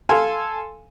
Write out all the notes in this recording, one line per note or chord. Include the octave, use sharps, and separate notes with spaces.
A4 F5 G#5 C6